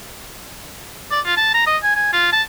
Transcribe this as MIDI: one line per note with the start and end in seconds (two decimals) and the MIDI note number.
1.11 1.20 74
1.25 1.35 65
1.37 1.52 81
1.54 1.64 82
1.67 1.77 75
1.83 1.93 80
1.95 2.12 80
2.13 2.30 65
2.33 2.42 81